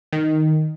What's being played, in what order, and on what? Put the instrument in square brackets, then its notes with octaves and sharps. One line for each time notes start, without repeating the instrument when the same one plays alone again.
[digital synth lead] D#3